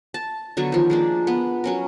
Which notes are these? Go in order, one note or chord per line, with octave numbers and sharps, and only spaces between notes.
A5
D3 F#3 B3 C#6
D#3 F3
G#3 A#3 D4
B3
F#3 C#4 A#4